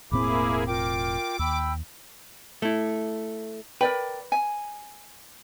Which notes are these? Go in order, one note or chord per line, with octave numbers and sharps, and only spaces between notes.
E1 A2 A#3 C4 E4 G#4 B5 D6
F4 A#4 G5 D6
D#2 G5 B5 E6
A3 E4
A#4 B4 D5 G5
G#5